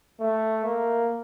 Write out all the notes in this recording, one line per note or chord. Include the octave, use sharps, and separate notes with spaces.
A3
A#3